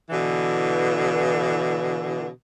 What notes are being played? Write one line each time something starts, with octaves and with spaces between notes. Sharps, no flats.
B2 D3 E3